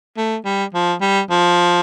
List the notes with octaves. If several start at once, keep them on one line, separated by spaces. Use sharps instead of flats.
A3
G3
F3
G3
F3